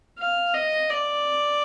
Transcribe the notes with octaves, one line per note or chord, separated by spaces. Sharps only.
F5
D#5
D5